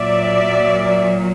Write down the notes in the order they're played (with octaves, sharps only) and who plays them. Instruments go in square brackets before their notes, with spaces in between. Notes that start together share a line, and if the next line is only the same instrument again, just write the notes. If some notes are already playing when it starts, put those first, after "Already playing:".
Already playing: [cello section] A#2 F#3 D5 E5